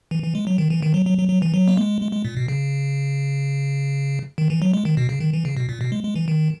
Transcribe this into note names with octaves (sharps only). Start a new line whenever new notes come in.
E3
E3
G#3
F#3
D#3
E3
D#3
F#3
F#3
F#3
F#3
E3
F#3
A#3
G#3
G#3
G#3
A#2
B2
C#3
D#3
E3
F#3
G#3
D#3
B2
C#3
D#3
E3
C#3
B2
A#2
B2
G#3
G#3
E3
D#3